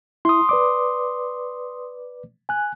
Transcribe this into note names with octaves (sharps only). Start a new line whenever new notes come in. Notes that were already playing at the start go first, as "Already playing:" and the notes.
E4 C6 D#6
B4 D5 D6
G#5 F#6